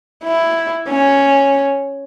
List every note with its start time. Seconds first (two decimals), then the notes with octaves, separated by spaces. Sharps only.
0.24 E4
0.89 C#4